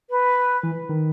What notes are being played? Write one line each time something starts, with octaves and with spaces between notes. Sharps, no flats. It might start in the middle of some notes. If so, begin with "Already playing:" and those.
B4
E3
D#3